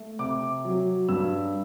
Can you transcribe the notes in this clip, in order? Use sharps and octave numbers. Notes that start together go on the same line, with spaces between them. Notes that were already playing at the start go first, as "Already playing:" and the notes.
Already playing: A3
C3 D6
F#3
G2 E6